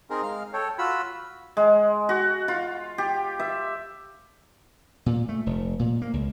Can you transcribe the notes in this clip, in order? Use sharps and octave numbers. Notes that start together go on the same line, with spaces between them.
C4 D#4 G#4 A#4
G#3 F5 F6
A4 C#5 G5
F4 F#4 B5 E6
G#3
F#4
F4
G4
E5
A#2
A3
F1
A#2
A#3
C#2